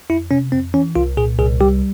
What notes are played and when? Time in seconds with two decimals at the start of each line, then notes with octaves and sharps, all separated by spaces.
0.10 F2 E4
0.31 C3 C#4
0.52 F2 C4
0.74 E3 C#4
0.96 C2 F4
1.17 A#2 G#4
1.39 C2 G#4
1.61 G3 G4